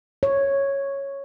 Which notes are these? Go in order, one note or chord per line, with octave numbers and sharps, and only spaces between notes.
C#5